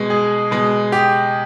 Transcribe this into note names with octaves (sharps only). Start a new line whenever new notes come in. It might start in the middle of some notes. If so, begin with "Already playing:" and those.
Already playing: B2 G#3
G#4
B2 G#3
G4